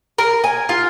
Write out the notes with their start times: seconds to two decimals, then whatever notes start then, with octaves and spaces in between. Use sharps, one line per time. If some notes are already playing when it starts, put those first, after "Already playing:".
0.18 A#4
0.44 G#5
0.69 F4